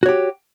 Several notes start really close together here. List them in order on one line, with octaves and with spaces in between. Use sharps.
F#4 C#5 G4